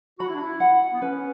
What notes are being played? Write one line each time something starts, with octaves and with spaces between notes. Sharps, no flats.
F#4 B5
E4
D4
E4
F#5
B3
C#4 B4